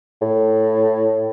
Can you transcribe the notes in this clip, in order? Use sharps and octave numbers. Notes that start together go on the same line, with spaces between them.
A2